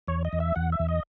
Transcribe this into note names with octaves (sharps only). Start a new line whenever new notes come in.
E2 C#5
D#5
E2
E5
E2 F#5
E5
E2
D#5